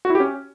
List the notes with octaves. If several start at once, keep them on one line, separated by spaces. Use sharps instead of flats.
F#4
E4
G4
C#4